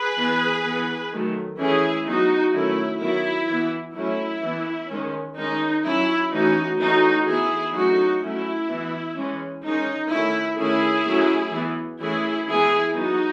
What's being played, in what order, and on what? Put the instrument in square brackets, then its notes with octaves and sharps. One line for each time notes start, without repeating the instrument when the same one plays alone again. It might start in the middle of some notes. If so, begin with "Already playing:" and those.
Already playing: [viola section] G#4 B4
E3 B3
E3 B3
D#3 F#3 A3
E3 A3 C#4 E4 G#4
F#3 B3 D#4 F#4
D#3 F#3 A3 C#4 E4
D#3 F#3 B3 E4
E3 B3
F#3 A3 C#4 E4
E3 B3
D#3 G#3 C#4
D#3 G#3 C#4 D#4
F#3 C#4 E4
E3 A3 C#4 D#4 F#4
E3 A3 C#4 D#4 F#4
E3 B3 E4 G#4
F#3 A3 C#4 D#4 F#4
F#3 A3 C#4 E4
E3 B3
E3 G#3 C#4
D#3 G#3 C#4 D#4
D#3 A3 C#4 E4
D#3 A3 C#4 E4 G#4
F#3 A3 C#4
E3 B3
E3 A3 C#4 E4 G#4
E3 G#3 B3 E4 G#4
F#3 B3 D#4 F#4